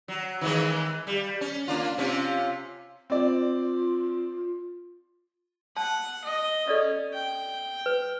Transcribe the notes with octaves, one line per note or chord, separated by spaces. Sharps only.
F#3
D#3 E3 G#3
G3
C#4
A#3 D4 F4
C3 C#4 F4
C4 F4 D5
F#5 A5
D#5
C#4 A4 D5 D#5
G5
B4